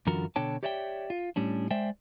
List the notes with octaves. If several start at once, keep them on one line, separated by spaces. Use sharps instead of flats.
F#2 D3 E3 F4 F#4 A#4
B2 D3 D4 C#5 G5 A5
G4 C#5 D5 E5 F5 G5
F4
A2 G3 C#4 D4
G#3 C5 D5 E5 G5